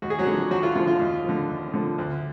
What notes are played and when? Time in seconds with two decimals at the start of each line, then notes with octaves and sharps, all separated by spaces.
0.02 D#2 F#4
0.10 G#4
0.19 F#3 F#4
0.27 D3 F3
0.50 D#2 F#3 F#4
0.63 F4
0.75 D3 F3 F4
0.87 F4
0.99 D#2
1.25 D3 F3
1.49 D#2
1.74 D3 F3
1.98 D2